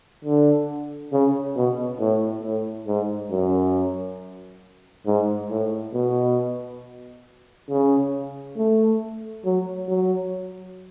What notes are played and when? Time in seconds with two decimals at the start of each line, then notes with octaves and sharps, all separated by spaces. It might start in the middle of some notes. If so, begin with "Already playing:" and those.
0.25 D3
1.13 C#3
1.56 B2
2.00 A2
2.43 A2
2.87 G#2
3.31 F#2
5.06 G#2
5.50 A2
5.94 B2
7.70 C#3
8.57 A3
9.45 F#3
9.89 F#3